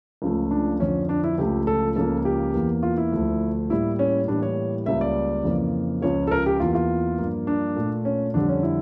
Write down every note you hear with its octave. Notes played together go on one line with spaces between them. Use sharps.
C#2 C#3 F3 A3
D4
F2 D3 F3 C#4
D4
E4
C#2 C#3 F3 A3 G4
A4
C#2 C#3 F3 A#3 A4
G4
E2 E3 A#3
F4
E4
D2 D3 F3 A3
A2 G3 A#3 E4
C#4
A2 E3 G3 A#3 D4
C#5
C#2 C#3 G3 A#3 E5
D5
F2 C#3 E3 A#3
C#2 C#3 F3 C#5
A4
A#4
G4
E2 E3 A#3 F4
F4
G2 F3 A#3
D4
A#2 A3
C#4
F2 D3 G3 D4
C#4
E4